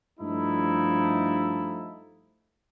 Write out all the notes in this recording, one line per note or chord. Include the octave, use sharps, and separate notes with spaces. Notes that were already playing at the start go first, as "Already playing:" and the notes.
G2 F3 A3 D#4 E4 A4